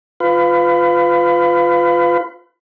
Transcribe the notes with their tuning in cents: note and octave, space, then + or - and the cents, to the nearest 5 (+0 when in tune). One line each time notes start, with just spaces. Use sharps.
F4 +0 B4 +30